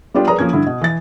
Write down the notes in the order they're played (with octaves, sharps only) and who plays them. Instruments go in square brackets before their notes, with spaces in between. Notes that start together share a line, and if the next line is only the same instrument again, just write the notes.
[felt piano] G3 B3 D4 F4 G4
G#4 A#4 B4 D5 A#5 D#6
F3 A#3 C#4 G#6
G2 D3 E4
B2
E3 A6